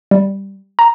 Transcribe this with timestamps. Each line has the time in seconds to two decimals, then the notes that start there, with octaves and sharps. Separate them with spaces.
0.11 G3
0.79 A#5